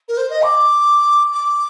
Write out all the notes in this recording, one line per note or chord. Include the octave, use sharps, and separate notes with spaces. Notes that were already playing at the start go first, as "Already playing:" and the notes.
A#4
C5
D#5
D6
D6